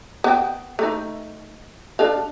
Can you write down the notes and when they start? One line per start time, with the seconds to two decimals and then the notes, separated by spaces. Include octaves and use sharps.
0.24 B3 G5
0.79 A3 D#4
1.99 D4 A4 F5